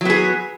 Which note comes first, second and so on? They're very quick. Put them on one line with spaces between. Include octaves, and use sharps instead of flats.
F#3 B3 G#4